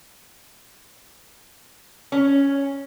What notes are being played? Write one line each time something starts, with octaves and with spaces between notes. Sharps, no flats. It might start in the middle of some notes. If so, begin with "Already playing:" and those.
C#4